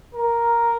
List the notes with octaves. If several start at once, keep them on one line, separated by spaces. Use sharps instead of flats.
A#4